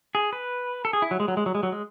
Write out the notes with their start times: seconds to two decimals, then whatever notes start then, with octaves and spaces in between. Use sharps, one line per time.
0.15 G#4
0.33 B4
0.85 A4
0.93 G#4
1.02 E4
1.11 F#3
1.20 G#3
1.28 F#3
1.37 G#3
1.46 F#3
1.55 G#3
1.63 F#3
1.72 G#3